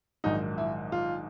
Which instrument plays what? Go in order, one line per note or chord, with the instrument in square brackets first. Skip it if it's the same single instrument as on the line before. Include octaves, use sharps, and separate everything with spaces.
[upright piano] A#1 G#2 D#3 F#3 D#4
E4
F4